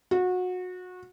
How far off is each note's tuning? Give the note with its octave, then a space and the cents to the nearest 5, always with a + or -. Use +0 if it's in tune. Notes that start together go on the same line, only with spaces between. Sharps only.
F#4 -25